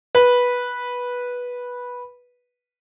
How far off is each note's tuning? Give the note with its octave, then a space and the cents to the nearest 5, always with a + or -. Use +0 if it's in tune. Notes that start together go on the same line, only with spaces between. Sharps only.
B4 -10